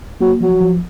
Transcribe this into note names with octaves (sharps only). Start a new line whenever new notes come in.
F#3 A#3
F3 F#3
F3